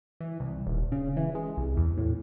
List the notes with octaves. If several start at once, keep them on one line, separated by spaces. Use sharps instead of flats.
E3
C2
D#1
C#3
E3
G#3
C2
E2
A2